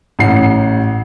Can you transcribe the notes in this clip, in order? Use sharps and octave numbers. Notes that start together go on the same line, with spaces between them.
A1 F#5 C7